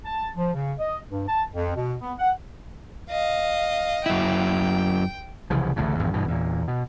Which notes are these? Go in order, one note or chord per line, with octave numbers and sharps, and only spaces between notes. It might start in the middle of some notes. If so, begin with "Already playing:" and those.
A5
F3
C#3
D#5
G2
A5
F2
B2
B3
F#5
D#5 F5
F#2 E4 G5
C2 C#3 E3 F3
A1 D2 A2 C#3
G#1 E2 G2
G2 B2 E3
E2 A#2
B2